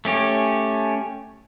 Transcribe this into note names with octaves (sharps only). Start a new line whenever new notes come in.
A3 C#4 G4